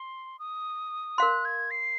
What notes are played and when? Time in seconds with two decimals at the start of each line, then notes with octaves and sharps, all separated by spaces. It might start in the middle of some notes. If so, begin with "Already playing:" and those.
Already playing: C6
0.39 D#6
1.18 A#4 F5 C6 F#6
1.45 G#6
1.71 C7